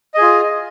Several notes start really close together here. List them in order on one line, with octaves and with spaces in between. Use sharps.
D#5 G#4 F4